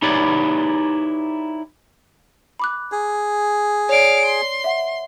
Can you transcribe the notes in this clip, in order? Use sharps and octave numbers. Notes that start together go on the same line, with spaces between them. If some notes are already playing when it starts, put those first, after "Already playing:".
D#4 E4 G4 B4 C#5 D5
B5 D6 F#6
G#4
C#5 D5 F5 D7
C6
E5 F#5